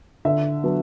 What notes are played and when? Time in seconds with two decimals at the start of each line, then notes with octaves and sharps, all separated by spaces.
0.25 D3 E5
0.63 F#3 B3 D4